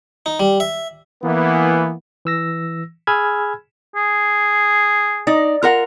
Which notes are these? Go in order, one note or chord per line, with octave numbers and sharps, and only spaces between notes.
D#4
G3
E5
E3 A#3 B3
E3 E6 A#6
G#4 G#5 B5 E6 F6 G#6
G#4
D#4 D5
F4 A#4 F#5